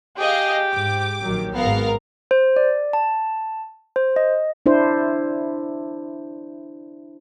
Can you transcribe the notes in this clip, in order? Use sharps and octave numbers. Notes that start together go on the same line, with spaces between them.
G4 G#4 D#5 F5
G#2 D6
A#1 D#3 F#3
G#1 G#2 B3 A#4 F5
C5
D5
A5
C5
D#5
D4 E4 C5